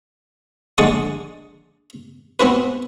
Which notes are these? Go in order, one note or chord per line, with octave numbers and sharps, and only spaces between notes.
A#1 D3 G#3 D5 C#6 D#6
B3 C4 F#4 B4